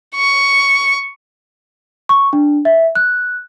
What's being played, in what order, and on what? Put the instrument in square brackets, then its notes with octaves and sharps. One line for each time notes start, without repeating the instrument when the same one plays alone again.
[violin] C#6
[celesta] C#6
D4
E5
F#6